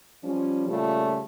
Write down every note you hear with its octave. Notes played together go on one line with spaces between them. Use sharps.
F3 G3 C#4
A#2 C#3 G3 A3 F4 G#4